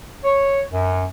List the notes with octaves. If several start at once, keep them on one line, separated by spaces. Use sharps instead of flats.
C#5
F#2